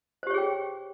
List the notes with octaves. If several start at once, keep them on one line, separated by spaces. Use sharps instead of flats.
G4 G#4 C5 C#5 G5